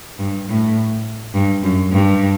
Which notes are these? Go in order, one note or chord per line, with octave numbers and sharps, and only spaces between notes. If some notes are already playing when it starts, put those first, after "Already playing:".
G2
A2
G2
F#2
G2